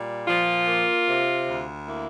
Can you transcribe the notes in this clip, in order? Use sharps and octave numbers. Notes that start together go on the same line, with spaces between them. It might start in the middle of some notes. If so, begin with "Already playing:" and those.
Already playing: A#2 G3
F3 F4
A#3
C3
D2
A#3 E4